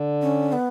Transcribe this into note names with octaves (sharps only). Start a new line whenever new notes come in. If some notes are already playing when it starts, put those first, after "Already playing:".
Already playing: D3
C#4
B3